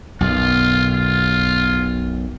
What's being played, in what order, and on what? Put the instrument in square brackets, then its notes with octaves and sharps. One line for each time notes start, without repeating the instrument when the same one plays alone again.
[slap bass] B1 F#2 B2 [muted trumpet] F4
[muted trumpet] F4